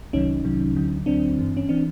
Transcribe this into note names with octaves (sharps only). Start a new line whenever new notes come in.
C2 C3 D#3 F#3 C#4 D#4
C2 C3 D#3 F#3
D2 D3 F#3
D2 D3 F#3 C4 D4
G2 E3
C#4
E3 C4 D4